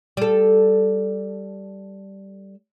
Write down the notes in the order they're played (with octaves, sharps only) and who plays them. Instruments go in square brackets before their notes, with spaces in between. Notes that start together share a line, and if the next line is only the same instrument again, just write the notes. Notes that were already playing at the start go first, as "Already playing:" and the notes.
[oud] G3 A4